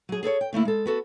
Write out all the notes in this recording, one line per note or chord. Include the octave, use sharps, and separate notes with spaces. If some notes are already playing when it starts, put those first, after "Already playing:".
F#3 G#4
G#4 A4 B4 C#5
G5
D3 A3 A#3 E4
G#3 A4
B3 F#4 A4